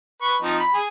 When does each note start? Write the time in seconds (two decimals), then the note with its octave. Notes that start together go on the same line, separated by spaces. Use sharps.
0.22 B4 C#6
0.42 F3 C4 D#4
0.60 B5
0.74 G#4